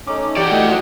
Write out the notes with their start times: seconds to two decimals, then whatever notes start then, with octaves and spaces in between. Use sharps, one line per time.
0.07 A3 C#4 D#4 D6
0.37 E3 F#4 G4 D5 C#7
0.52 A3 D#5
0.66 A2 F3 G3